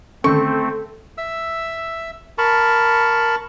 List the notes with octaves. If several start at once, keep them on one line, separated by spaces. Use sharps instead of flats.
D3 D#3 A3 C4 C#4 A4 C#6
E5 E6
A#4 A5 B5 C#6